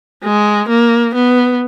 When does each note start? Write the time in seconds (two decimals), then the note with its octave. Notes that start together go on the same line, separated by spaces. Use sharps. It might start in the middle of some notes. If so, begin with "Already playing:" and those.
0.24 G#3
0.69 A#3
1.14 B3